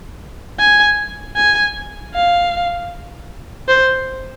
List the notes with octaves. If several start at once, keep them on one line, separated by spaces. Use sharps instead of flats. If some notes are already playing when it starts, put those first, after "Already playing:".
G#5
G#5
F5
C5